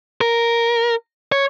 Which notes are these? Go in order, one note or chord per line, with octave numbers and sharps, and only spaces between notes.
A#4
C#5